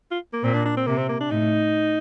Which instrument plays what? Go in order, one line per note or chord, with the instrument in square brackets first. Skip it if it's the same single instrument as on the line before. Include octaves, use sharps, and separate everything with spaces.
[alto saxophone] F4
A#3
[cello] A#2 [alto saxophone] C4
[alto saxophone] D4
D4
C4
[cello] C3 [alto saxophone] A#3
[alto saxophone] C4
A#3
D4
[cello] A2 [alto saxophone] D#4